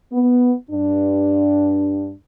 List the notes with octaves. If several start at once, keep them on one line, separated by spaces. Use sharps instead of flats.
B3
G2 D4